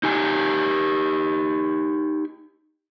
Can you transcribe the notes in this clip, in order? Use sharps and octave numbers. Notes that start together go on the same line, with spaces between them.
D#4 G4 G#5